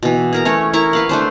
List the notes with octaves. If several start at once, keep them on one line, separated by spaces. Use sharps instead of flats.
B2 E3
G#4 A#4 A#5
A3 C#4 C#5
E4 A#4 A#5 C#6
B4 F5 F#5
A3 D4 C5